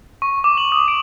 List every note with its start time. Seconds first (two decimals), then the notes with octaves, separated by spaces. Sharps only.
0.22 C#6
0.44 D6
0.57 F#7
0.72 D#6
0.88 D7